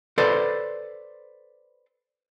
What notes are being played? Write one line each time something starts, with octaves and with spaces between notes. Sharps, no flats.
A4 B4 C5 D5